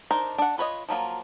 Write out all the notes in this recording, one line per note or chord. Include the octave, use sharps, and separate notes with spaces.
D4 D#4 A#4 C5
D4 F#5
F4 B4 C#5 D#5
F3 F#3 A#3 F4